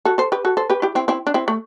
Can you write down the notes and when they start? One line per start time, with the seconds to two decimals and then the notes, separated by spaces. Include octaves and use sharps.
0.05 F#4 A4
0.18 A4 C5
0.32 G4 B4
0.45 F#4 A4
0.57 A4 C5
0.70 G4 B4
0.82 E4 G4
0.95 C4 E4
1.08 C4 E4
1.27 D4
1.34 C4 E4
1.48 A3